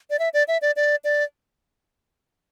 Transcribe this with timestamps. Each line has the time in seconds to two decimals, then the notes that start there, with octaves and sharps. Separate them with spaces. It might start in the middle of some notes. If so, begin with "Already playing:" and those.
0.10 D5
0.19 E5
0.34 D5
0.48 E5
0.62 D5
0.76 D5
1.04 D5